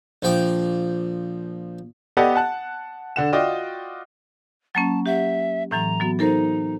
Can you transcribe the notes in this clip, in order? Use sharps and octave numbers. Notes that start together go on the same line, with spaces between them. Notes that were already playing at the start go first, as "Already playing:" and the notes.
A#1 F3 G5 D6
B3 G4 A4 D5 D#5 F#5
F#5 A5 F#6
D3 F#5 E7
F4 F#4 D5 D#5 G5
F#3 A#3 C#4 A5
G4 E5 F#5
A2 E3 F#3 A#5
F#3 B3 F#4
D#4 A4 A#4 C5